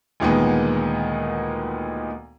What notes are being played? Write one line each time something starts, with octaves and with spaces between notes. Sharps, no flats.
D2 A#2 D#3 G#3 B3